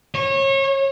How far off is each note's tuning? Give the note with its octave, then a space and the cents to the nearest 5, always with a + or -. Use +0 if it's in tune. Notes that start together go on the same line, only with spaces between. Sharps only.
C#5 -30